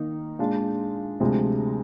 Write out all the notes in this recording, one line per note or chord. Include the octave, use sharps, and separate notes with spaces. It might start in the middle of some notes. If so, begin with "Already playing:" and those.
Already playing: D#3 A#3 D#4
A#2 G#3 D4 F4
D2 C3 F3 G#3 D4